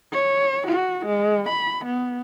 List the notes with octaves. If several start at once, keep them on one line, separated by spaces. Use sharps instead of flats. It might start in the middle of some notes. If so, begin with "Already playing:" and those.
C#5
F#4
G#3
B5
B3